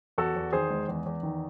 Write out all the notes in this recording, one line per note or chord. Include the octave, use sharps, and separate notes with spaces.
E2 F#4 A4
E2
D#3 G#4 C5
G#3
E2
E2
D#3